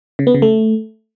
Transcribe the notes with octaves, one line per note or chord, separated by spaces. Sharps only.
C#3
B3
C#3
A3